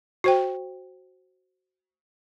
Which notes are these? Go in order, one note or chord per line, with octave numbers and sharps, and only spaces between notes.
F#4 C5 G5